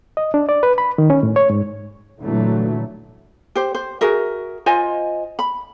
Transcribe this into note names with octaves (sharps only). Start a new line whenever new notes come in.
D#5
D4
D5
B4
B5
D#3
C#4
A2
C#5
G#2
A#2 D3 E3 F#3 A3
G4 C5
C5
F#4 G#4 A#4 E5
F4 C5 D#5 G#5
B5